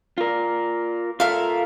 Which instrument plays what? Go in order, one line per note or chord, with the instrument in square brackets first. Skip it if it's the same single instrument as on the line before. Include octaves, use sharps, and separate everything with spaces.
[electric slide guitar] F4 A#4
[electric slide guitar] F4 A4 E5 [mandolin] A#4 F5